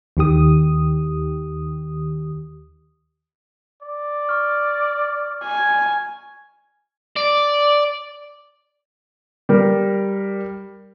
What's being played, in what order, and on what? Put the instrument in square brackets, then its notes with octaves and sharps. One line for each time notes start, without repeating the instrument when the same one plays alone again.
[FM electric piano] D#2 D#3 G4 D#6
[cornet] D5
[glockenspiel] C#6 F6
[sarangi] G#5
[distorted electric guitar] D5
[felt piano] G3 A#4